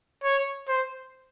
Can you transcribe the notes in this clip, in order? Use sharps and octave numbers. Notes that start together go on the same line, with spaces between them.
C#5
C5